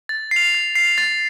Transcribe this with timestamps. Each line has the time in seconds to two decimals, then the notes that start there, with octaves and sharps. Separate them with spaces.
0.09 A6
0.31 C7 F7
0.54 A6
0.75 C7 F7
0.98 A6